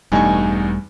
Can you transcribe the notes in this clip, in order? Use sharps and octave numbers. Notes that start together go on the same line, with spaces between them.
E1 E2 G2 G3 A3 D#4 G#5 C#6